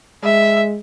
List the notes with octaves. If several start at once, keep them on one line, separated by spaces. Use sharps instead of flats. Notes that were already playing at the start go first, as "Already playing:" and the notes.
G#3 E5